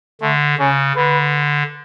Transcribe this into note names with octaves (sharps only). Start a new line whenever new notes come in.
D3 A3
C#3 C#4
D3 B4